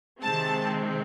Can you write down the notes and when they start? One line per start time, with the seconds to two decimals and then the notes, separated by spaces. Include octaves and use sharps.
0.22 C3 D#3 G#3 C4 A5